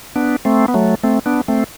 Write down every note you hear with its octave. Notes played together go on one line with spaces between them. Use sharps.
B3 D4
A3 C4
B3
F#3 A3
A3 C4
B3 D4
A3 C4